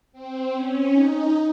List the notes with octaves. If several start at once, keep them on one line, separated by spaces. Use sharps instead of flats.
C4
C#4
D#4